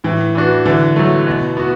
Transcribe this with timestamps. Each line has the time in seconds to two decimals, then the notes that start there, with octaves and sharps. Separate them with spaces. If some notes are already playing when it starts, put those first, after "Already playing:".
0.04 A2 E3
0.35 E3 D4 F#4
0.65 D3 E3
0.96 F#3 A3
1.27 B2
1.57 B3 F#4